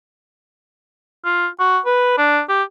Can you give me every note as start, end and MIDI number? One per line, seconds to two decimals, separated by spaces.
1.25 1.47 65
1.60 1.79 66
1.86 2.16 71
2.18 2.41 62
2.49 2.63 67